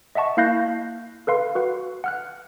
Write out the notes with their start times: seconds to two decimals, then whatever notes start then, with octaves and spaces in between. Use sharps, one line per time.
0.15 D#5 E5 F#5 A5 C#6
0.37 A#3 E4 F5 F#6 G6 A#6
1.27 A4 B4 F5 C6
1.55 F#4 B4 F#5
2.04 F#5 F6 F#6